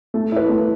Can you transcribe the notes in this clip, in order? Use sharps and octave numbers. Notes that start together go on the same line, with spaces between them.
A3
E4 B4
A3